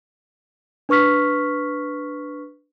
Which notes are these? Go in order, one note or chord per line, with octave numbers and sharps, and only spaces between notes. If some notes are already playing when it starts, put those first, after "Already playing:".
D4 B4 C#6 F6 B6